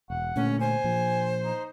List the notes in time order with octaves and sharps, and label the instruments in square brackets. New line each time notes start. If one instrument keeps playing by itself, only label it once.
[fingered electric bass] E1 [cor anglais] F#5
[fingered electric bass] A#2 D3 A3 [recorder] C#4
[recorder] C5 [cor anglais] G#5
[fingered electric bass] A#2 F3
[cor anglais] D#4